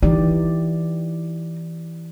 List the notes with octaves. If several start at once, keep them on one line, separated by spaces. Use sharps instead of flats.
E3 D#4 G4 D5